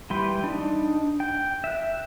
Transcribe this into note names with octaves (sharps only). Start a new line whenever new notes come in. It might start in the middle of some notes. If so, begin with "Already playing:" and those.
E3 G3 B4 G5 C6
D4 D#4
G5
E5 F#6